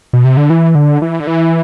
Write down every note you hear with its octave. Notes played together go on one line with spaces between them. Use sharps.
B2
C3
D3
E3
D3
E3
D3
E3